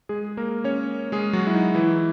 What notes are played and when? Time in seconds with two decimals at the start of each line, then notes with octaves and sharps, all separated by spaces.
0.09 G#3 G#4
0.37 A#3 A#4
0.64 C#4 C#5
1.12 G#3 G#4
1.33 F#3 F#4
1.47 E4
1.54 D#4
1.75 E3 E4